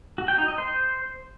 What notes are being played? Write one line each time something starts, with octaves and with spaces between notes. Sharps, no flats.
F#4
G5
D#4
D#5
C5